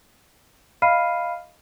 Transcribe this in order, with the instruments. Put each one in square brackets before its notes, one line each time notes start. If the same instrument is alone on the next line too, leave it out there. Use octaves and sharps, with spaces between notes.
[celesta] D#5 F5 B5 F6 C7 D#7